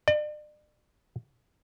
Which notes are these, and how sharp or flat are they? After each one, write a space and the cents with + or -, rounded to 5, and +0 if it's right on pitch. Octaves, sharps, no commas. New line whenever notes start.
D5 +40